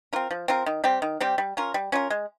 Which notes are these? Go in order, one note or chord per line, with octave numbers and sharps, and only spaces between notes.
C4 F4 A#4
F3
C4 F4 A#4
D#3
G3 C4 G4
D#3
G3 C4 G4
G3
C#4 F4 A#4
G3
C#4 F4 A#4
G#3